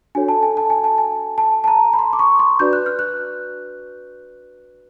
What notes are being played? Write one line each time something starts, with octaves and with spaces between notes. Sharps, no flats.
D4 F#4 A4 C#5 G#5
A5
G#5
A5
G#5
A5
G#5
A5
A5
A#5
B5
C6
D6
C#6
C6
D4 F#4 B4 D5 G6
F#6
F6
F#6